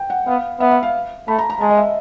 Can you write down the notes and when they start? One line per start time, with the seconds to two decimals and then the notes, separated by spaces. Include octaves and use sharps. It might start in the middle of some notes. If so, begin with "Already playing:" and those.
Already playing: G5
0.10 F#5
0.27 B3 F5
0.60 B3 E5
0.71 E5
0.83 F5
1.28 A3 B5
1.39 A#5
1.50 A#5
1.61 G#3 A5
1.70 D#5
1.77 E5